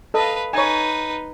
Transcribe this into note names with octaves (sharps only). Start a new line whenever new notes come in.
A4 B4 D#5 F5
D#4 B4 C#5 G#5